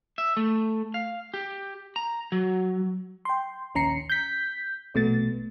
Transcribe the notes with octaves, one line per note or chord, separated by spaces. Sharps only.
E5
A3
F5
G4
A#5
F#3
G5 C6
A#1 D#2 C#4 A#5 C7 C#7
G6 B6
A#1 B2 A3 B3 A6